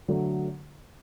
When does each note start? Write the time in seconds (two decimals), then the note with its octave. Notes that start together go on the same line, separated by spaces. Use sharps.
0.08 D3 F#3 A3